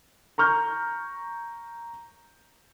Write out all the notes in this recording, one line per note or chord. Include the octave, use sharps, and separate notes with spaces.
A#5 C#6 F6 G6